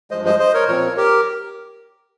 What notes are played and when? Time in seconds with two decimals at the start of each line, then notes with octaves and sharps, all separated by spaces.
0.11 G2 F3 G#3 C5 D#5
0.25 C5 D#5
0.39 C5 D#5
0.54 A#4 C#5
0.68 A#2 F3 C4 A#4 C#5
0.96 G4 A#4